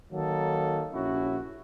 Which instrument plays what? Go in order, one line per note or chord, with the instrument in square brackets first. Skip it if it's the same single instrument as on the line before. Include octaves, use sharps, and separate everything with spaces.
[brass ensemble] D#3 F#3 A#3 D#4 A4
A#1 C#4 E4 F#4